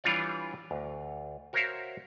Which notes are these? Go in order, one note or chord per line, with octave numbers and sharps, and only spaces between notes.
E3 G3 D4 F4 C#5 D5
D2
F#4 A#4 C5 C#5 E5 F5